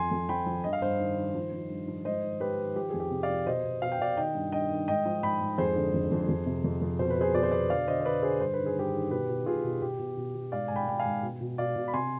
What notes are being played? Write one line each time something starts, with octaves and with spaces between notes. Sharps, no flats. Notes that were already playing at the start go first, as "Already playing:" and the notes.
Already playing: F2 G#5 C6
F2
F3 G5 B5
F3
G2 D#5
F5
G2 C5 D#5
D#3
D#3
F3
F3
G2
F3
G#2 C5 D#5
D#3
G#2 G4 B4
D#3
F3 G4
F2 G#4
G4
C3
D5 F5
F3
B2 C5 D#5
B2
B2 F5
G5
B2 D5 F5
D#3 D#5 G5
G2
G2 D#5 G5
D#3
G#2 D#5 G5
F3
G#2 G5 B5
G#2
F2 G#4 C5
D3
F2
F2
F2
C3
F2
F2
B2 C5
B4
B2 G#4 C5
B2 D5
C5
B2 B4 D5
D3 D5 F5
D3 C5 D#5
C5
D3 B4 D5
D3 G#4 C5
G2 C5
D#3 B4
G#4
G2 G4 B4
D#3
B2 G4 B4
B2
B2 F4 G#4
B2
B2 G4
B2
B2
B2
G#2 D5 F5
G#2 G#5
G5 B5
G#2 G5
F5 G#5
G#2
B2
B2
B2 D5 F5
B2
B5
C3 G#5 C6